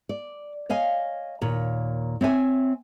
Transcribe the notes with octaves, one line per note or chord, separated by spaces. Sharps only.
D5
C#5 D#5 F5 G#5
D#2 A#2 C#5
C4 C#5 E5 G#5